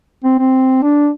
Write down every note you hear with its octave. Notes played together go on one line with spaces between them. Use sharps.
C4
C4
D4